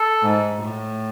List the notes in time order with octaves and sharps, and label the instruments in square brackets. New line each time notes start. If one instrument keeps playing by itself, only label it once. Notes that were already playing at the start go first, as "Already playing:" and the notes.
Already playing: [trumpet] A4
[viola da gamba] G#2
A2